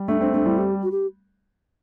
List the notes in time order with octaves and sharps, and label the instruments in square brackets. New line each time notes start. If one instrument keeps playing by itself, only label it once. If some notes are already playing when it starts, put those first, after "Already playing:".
Already playing: [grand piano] G3
[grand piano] A3 [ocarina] D4
[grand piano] C4 [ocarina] D4
[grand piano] A3 [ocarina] D4
[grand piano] G3 [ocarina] E4
[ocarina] G4
F#4
G4